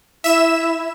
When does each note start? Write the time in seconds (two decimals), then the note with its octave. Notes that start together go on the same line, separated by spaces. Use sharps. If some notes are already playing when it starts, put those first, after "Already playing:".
0.24 E4 E5 E7